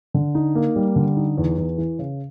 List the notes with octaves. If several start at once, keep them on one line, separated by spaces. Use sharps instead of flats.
D3
D#4
A#3
G3
D3
D#4
E2
E2
E3
C#3